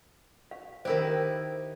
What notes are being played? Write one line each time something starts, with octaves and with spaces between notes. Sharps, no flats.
F5
D#3 E4 G4 A#4 C5